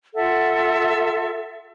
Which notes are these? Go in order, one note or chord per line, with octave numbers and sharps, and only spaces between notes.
F4 A4 E5 F#5